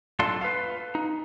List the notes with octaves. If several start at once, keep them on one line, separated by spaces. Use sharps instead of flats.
F#2 A#2 D4 F4 A4 C6
B4 F5
D#4